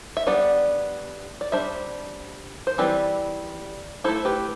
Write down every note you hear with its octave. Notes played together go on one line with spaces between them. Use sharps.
E5
G3 B3 D4 D5 F#5
D5
G3 D4 C5 E5
C5
E3 G3 C4 B4 D5
A3 E4 A4 C5
G4 B4